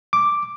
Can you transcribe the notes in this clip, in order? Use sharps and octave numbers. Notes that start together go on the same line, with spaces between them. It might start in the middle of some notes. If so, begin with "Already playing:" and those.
D6